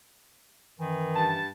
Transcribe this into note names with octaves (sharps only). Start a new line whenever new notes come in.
F#2 D#3 E3
G2 A5